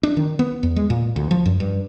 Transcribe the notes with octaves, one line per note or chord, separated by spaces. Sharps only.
D4
D#3
B3
E2
G#3
A#2
D2
F3
F#2
G2